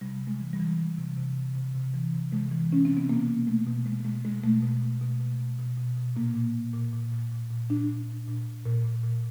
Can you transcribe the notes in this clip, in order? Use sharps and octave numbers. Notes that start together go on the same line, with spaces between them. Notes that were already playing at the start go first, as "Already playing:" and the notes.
C3 G3
C3
G#3
E3
G3
E3
E3
C3
C3
C3
C3
C3
E3
C3
C3 G#3
E3
E3 C#4
C3 C4
B3
B2 A#3
B2
B2 A3
B2
B2 G#3
B2 G#3
B2 G#3
B2 A3
B2
B2
B2
B2
B2
B2
B2
B2
A#2 A#3
A#2
A#2
A#2
A#2
A#2
A#2
A#2
A#2 D4
A#2
A#2
A#2
A#2
A#2
A#2
A#2